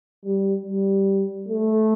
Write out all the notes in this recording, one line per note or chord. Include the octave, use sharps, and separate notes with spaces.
G3
G3
A3